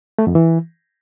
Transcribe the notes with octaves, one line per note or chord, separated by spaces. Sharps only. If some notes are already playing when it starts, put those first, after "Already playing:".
A3
F2
E3